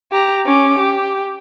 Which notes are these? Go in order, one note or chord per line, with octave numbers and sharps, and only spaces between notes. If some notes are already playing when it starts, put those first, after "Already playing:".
G4 A#5
C#4 D6
G4